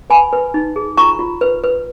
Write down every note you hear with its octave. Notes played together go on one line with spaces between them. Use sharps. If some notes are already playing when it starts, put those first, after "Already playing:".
B4 G#5 B5
B4
D#4
G#4
F4 A#5 C#6
F4
B4
B4